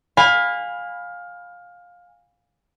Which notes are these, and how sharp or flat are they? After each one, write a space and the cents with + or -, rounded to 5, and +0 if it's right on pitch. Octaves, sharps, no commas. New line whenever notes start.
F5 +20 G#5 -25 B5 +0